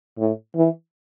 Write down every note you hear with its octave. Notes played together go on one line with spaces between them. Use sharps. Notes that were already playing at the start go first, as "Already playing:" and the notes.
A2
E3